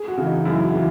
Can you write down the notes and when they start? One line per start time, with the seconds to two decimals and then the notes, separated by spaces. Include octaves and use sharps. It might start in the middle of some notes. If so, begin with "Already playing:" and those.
Already playing: G#4
0.08 F#4
0.17 C#3 E3
0.26 D#4
0.45 F#2 E4
0.64 F#4
0.74 C#3 E3